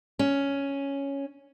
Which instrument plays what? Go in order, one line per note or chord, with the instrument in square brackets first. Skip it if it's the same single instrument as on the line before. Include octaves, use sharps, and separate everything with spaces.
[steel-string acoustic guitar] C#4